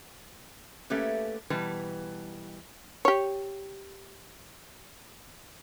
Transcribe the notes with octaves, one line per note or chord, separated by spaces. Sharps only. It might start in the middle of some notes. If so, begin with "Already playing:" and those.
A3 A#3 C#4 G4 B4
B2 E3 G3 B4 A5
G4 C#5